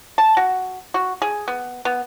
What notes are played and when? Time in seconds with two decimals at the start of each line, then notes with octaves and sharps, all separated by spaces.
0.18 A5
0.37 F#4
0.94 F#4
1.22 G#4
1.48 B3
1.85 B3